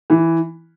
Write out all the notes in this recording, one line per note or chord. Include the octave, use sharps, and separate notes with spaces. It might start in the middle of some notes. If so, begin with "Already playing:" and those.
E3